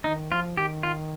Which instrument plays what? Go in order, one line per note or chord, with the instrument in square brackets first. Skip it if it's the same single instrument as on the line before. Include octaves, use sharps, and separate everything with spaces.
[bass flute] D#3 [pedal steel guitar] D#4
[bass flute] F3 [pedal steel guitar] F4
[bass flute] D#3 [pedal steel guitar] G4
[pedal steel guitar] F4